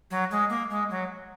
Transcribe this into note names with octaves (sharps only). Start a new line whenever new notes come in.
F#3
G#3
A#3
G#3
F#3